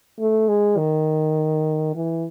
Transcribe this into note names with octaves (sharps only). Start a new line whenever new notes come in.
A3
G#3
D#3
E3